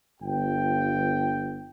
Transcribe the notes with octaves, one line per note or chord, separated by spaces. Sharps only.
G1 F4 G5